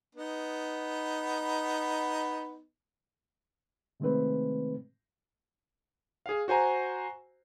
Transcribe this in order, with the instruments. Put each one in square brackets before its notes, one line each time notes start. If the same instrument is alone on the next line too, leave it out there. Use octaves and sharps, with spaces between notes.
[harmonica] B3 D#4
[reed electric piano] C3 D#3 G#3 A3 C4 B4
[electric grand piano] G#4 F5
F#4 C5 G#5 A#5